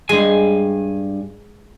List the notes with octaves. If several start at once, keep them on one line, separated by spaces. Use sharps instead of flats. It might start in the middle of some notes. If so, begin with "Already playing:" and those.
G2 G#3 G#5